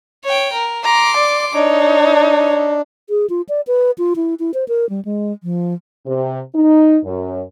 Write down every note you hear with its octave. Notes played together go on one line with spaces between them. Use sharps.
C#5 G5
A#4
A#5 C6 D6
D5
D4 D#4 C#5
G#4
F4
D5
B4
F4
E4
E4
C5
A#4
G3
G#3
F3
C3
D#4
F#2